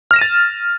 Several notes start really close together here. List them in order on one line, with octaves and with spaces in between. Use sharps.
F6 A#6 E7 D#7 A6